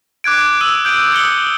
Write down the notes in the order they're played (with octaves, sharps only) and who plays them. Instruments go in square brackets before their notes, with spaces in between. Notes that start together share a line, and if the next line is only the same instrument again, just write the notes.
[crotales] D6 F#6 G#6 D7
D#6 E6 D7 D#7 F#7
G6 D7
D#6 E6 C#7 D7 G7